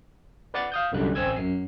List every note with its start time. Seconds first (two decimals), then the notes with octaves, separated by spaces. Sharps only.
0.54 B4 D5 F#5 F#6 A6
0.72 F5 D#6 G6
0.92 C2 F#2 D3 G3 F#6
1.15 A1 C4 G#5 E6 G#6
1.36 F#2 C7